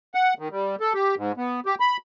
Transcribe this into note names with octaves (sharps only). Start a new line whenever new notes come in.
F#5
D#3
G3
A4
G4
G#2
B3
G4
B5